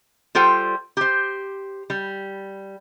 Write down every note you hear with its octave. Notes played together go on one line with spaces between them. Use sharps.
G3 F4 A4 C5 G5
G4 C5
G3